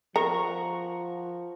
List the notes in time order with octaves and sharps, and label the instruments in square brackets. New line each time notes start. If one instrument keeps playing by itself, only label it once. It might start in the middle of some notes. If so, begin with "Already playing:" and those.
[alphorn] F3 [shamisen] A#4 [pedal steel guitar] F#5 A#5 C#6